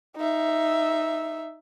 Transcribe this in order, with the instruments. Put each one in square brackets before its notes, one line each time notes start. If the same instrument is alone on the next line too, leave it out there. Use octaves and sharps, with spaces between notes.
[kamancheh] D#4 E5